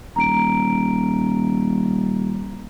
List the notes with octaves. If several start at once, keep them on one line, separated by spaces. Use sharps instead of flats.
D#1 A#5 D7